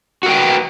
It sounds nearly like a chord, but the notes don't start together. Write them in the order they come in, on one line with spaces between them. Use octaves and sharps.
F#4 A#4 G5 B4